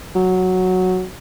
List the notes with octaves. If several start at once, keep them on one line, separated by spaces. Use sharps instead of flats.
F#3